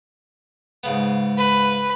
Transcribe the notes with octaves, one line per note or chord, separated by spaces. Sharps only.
G#2 C#3 B3
B4